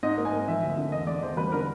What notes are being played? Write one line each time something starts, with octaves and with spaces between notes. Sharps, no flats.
G#2 D#5
A#3
G#5
A#3
F3 E5
D2
E5
D3
E2 D#5
G#3 D5
E2 C5
G3 B4
D3 A#4